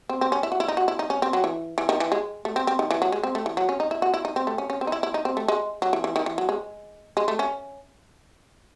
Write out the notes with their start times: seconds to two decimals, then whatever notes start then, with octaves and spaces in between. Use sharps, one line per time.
0.09 C4
0.21 C4
0.32 C#4
0.43 E4
0.52 F#4
0.60 E4
0.68 D#4
0.77 F#4
0.88 E4
0.99 D#4
1.10 C#4
1.22 C4
1.33 F#3
1.44 E3
1.78 E3
1.89 D#3
2.00 E3
2.12 G#3
2.45 A3
2.56 C4
2.67 C4
2.79 D#3
2.91 E3
3.02 F#3
3.12 G#3
3.23 C4
3.35 A3
3.46 E3
3.57 F#3
3.69 C#4
3.80 D#4
3.91 E4
4.02 F#4
4.14 E4
4.25 D#4
4.36 C4
4.47 A3
4.58 C#4
4.70 C#4
4.81 C4
4.87 D#4
4.92 E4
5.03 E4
5.14 D#4
5.25 C4
5.37 A3
5.48 G#3
5.82 F#3
5.93 E3
6.04 E3
6.16 D#3
6.26 E3
6.38 F#3
6.49 G#3
7.17 G#3
7.28 A3
7.39 C#4